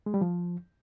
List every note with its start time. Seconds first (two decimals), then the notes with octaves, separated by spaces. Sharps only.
0.06 G#3
0.14 G3
0.21 F3